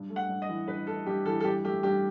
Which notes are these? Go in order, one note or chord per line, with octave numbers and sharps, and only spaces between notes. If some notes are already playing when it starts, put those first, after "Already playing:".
Already playing: G2
A3
F#5
G2
D#5
E3
G2 B4
A3 A4
G2 G4
E3 A4
A4
G2 G4
A3 G4
G2 G4